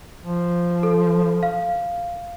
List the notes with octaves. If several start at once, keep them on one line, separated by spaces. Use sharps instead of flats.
F3
A4
F5